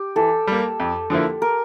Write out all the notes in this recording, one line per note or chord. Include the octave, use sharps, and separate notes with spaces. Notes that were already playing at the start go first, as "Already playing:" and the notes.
Already playing: G4
E3 A4
G3 A#3
F2
D3 F3 A#3 E4
A#4